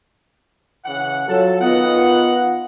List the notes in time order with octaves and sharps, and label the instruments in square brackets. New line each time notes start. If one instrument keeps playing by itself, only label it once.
[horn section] C#3 E3 F#5
[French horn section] F#3 F4 [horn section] A4
[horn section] D#3 D#5 F#5 [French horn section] B3 F4